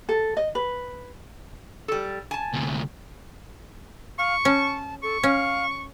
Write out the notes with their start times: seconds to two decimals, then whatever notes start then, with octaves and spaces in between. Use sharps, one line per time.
0.09 A4
0.37 D#5
0.55 B4
1.88 G3 A4
2.31 G#5 A5
2.54 D2 C3
4.18 F5 C#6
4.45 C#4 A5
5.03 A4 C#6
5.23 C#4 F5